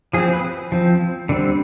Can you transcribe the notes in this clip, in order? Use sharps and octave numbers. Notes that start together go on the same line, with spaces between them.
F3 C4 G#4
B4
F3 C4
D3 G3 C4